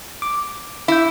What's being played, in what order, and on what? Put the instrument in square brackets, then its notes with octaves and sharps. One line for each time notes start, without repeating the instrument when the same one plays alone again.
[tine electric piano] D6
[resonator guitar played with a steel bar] E4 [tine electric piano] E5 G6